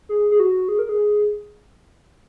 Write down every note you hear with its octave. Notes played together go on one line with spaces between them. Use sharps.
G#4
G#4
F#4
G#4
A#4
G#4